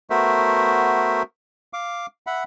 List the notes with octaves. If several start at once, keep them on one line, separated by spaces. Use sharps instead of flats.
A3 B3 F#4 A#4 C5 E5
F5 D6
E5 F#5 B5